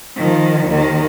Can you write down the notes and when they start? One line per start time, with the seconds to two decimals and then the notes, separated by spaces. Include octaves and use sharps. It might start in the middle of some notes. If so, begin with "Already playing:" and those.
0.16 D#3 F3
0.67 D#2 D#3